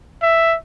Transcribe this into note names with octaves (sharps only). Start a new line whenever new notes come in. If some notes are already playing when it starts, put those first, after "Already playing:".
E5